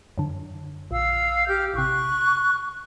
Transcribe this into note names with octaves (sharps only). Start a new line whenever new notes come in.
F#2 D3
A#1 F5 E6
G4 F6 G6
A1 C3 C#6 F#6